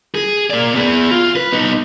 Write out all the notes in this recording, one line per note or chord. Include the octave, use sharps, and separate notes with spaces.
G#4
A#3 D5
B3 G#4
F4
B4
B3 D#4